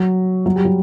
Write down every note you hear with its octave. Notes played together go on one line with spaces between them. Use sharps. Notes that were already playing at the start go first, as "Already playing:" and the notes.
Already playing: F#3
F#3
G3
F#3